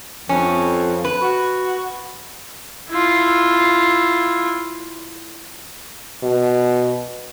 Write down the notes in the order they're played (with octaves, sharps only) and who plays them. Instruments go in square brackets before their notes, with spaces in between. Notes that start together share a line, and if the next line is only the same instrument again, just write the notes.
[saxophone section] F2 [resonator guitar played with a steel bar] C#4
[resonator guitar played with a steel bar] B4
[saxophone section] F#4
[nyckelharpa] E4 F4
[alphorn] B2